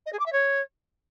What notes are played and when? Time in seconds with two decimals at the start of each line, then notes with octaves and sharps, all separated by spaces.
0.06 D#5
0.13 G#4
0.19 D6
0.26 E5
0.32 C#5